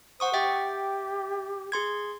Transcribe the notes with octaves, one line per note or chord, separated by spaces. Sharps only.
C5 F#5 C#6 D#6
G4 E5 G5 A6
G#4 C6 G#6